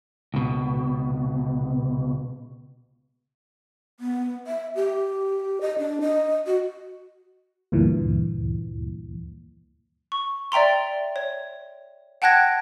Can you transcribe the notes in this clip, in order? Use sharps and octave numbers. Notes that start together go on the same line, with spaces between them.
C#2 B2
B3
E5
G4
D#5
D4
D#5
F#4
D2 G2 A#2 E3
C#6
D5 E5 G5 A#5 C6
C#5
F#5 G5 A5 F#6 G#6 A#6